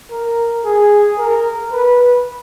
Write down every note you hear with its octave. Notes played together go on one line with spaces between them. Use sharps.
A#4
G#4
A#4
B4